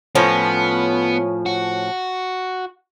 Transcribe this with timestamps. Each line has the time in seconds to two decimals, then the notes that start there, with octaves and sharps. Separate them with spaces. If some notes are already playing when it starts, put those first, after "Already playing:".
0.15 A2 F3 B3 C#4
1.46 F#4